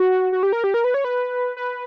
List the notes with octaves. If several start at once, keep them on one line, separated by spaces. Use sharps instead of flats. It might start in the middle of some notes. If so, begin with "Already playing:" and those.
Already playing: F#4
F#4
G4
A#4
G4
A#4
B4
C#5
B4
B4